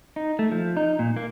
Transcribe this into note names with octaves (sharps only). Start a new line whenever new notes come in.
D#4
A3
F3
D#4
A#2
A#3